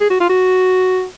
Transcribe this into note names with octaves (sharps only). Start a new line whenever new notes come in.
G#4
F#4
F4
F#4